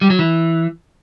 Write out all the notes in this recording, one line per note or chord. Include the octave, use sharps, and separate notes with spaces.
G3
F#3
E3